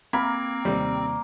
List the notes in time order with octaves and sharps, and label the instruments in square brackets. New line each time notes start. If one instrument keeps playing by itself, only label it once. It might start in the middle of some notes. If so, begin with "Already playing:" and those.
[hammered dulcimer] A#3 [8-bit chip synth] C4 [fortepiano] B5 [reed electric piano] G#6
[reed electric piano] D#2 C3 [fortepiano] G3